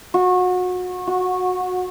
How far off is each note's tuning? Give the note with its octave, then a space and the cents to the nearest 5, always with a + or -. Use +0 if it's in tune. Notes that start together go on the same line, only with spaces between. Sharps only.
F#4 -30
F#4 -15